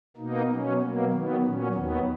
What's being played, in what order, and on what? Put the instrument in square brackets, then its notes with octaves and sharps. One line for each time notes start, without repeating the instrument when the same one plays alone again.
[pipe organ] B2 A#3 D#4
B2 F#3 C#4
B2 F#3 A#3
D#3 F#3 B3
A#2 F#3 C#4
D#2 D#3 F#3 B3